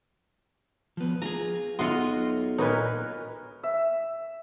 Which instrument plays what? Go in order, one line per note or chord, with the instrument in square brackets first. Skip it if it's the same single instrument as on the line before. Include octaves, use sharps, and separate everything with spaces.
[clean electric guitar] F3 B3
[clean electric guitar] F4 G4 G#4 [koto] A#5
[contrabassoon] B1 [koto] F4 D#5 [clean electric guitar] F#4 [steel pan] E5 F#5 C6
[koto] A#2 D#4 [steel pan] A#4 B4 C#5
[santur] E5